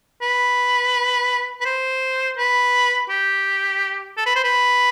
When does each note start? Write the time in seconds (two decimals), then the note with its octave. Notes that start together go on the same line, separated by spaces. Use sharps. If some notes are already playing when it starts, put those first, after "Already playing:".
0.22 B4
1.61 B4
1.65 C5
2.37 B4
3.10 G4
4.18 A4
4.26 B4
4.36 C5
4.44 B4